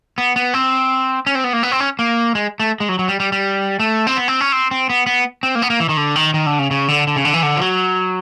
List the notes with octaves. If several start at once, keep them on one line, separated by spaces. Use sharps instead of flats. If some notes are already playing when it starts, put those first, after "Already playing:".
B3
B3
C4
C#4
C4
B3
A#3
B3
C4
C#4
A#3
G#3
A3
G#3
F#3
F#3
G3
G3
G3
A3
C4
B3
C4
C#4
C4
C4
B3
B3
C4
A#3
B3
A#3
E3
D#3
D3
D#3
D#3
D3
C#3
C#3
D3
D3
C#3
D3
E3
D3
F3
F#3